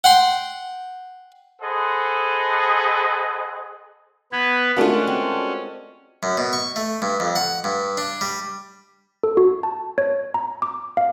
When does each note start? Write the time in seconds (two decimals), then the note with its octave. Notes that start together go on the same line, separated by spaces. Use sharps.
0.04 F#5 G5 C6
1.62 G#4 A4 C5 D#5 F#5 B5
4.32 B3 B4 G#6
4.76 G#3 A3 C#4 D4 F4 F#4 A#4
5.07 C4
6.23 F#2
6.37 B2
6.53 C#6
6.76 A3
7.02 G2
7.20 F2
7.36 F#5
7.64 G2
7.97 D4
8.21 G3
9.23 A4
9.37 F#4
9.63 A5
9.98 C#5
10.34 A#5
10.62 D6
10.97 F5